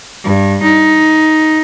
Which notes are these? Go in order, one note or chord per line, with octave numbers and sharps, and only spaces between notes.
G2
D#4